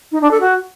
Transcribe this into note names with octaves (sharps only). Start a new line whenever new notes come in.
D#4
D4
A4
F#4